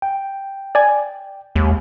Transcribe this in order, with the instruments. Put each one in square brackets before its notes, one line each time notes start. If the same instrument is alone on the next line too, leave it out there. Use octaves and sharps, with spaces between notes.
[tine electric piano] G5
[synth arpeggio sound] D5 G#5
[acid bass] D#2 [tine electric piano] G#3